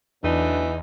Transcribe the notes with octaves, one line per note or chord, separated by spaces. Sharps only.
E2 A2 E3 F#3 D4 D#4